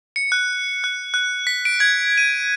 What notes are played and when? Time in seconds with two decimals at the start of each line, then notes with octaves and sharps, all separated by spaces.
0.16 C#7
0.32 F#6
0.84 F#6
1.14 F#6
1.47 B6
1.65 D7
1.80 G#6
2.18 D#7